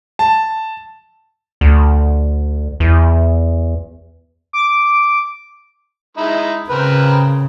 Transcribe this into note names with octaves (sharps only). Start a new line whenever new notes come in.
A5
D2
E2
D6
G#3 D#4 E4
C#3 C4 A#4 B4